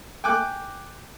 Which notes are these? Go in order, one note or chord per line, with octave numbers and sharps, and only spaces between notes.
G5 G#5 D6 F#6